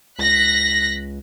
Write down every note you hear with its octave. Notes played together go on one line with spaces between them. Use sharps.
C#2 F#6 A#6 B6